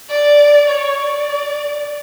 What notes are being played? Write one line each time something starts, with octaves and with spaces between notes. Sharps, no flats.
D5
C#5
D5